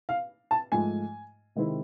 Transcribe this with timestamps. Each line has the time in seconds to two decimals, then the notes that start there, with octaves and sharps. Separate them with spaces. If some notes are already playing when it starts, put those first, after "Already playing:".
0.09 F5
0.51 A5
0.72 G#2 F3 A3 G#5
1.56 C3 D#3 G#3 C4 E4